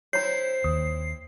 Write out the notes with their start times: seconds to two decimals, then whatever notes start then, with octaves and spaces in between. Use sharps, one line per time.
0.13 C4 E4 C#5 A#5 C7
0.64 D#2 D#6